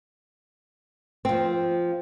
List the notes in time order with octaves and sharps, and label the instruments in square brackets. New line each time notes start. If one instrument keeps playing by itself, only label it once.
[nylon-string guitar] F3 C4